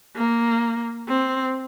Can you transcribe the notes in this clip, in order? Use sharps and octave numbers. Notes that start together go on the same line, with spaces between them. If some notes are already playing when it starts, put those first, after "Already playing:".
A#3
C4